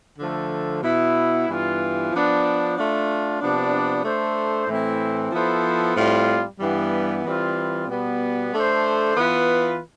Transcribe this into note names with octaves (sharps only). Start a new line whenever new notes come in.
D3 F3 A3
B2 B3 E4
G2 E3 B3 F4
F3 B3 D4
A3 D4 F4
C3 F3 B3 D4
A3 D4 A4 C5
A2 E3 A3 C4 E4
F3 B3 E4 A4 C5
A2 G3 C4 F4
G2 E3 G3 B3
E3 G3 C4 F4
B2 G3 B3
A3 D4 A4 C5
E3 B3 F4 B4